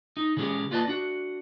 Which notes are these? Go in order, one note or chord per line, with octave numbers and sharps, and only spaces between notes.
D#4
C#3 E3 G#3 C#4 G4 G#4
A#3 F4 B4 D5 D#5 A5
D4 F#4